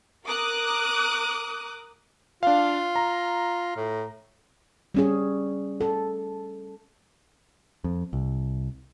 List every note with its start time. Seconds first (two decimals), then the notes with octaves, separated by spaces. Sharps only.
0.25 A#4 D6 D#6 F#6
2.43 D4 F4 F5
2.96 A#5
3.76 A2
4.94 G3 C#4 G#4
5.81 A4
7.84 F2
8.13 C2